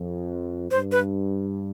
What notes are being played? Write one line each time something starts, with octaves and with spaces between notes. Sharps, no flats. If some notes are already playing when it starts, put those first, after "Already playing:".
Already playing: F2
G2 C5
B4